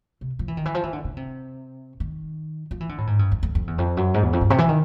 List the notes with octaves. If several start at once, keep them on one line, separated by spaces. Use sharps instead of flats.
C3
F3
E3
D#3
E3
F3
E3
D3
C#3
C3
D#3
F3
E3
D3
A2
G#2
G2
F2
F2
F2
E2
F2
F#2
G#2
E2
F2
G2
C3
E3
D#3